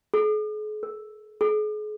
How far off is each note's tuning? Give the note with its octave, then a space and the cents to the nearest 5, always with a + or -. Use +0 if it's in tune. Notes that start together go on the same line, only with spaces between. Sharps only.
G#4 +45
A#4 -10
G#4 +40